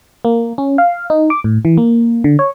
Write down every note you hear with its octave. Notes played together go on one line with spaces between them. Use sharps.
A#3
C#4
F5
D#4
D6
A2
E3
A#3
D3
C#5